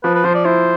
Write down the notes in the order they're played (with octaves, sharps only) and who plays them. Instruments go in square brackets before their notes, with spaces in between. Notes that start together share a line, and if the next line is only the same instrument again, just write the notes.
[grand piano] F3 [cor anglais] B4
[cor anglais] B4
[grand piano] F3 [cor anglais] C5
[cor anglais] D5
[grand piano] E4 [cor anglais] C5